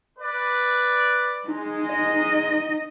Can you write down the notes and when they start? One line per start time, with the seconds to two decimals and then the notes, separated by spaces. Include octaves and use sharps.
0.19 B4 D5
1.45 G#3 D#4
1.85 D#4 D#5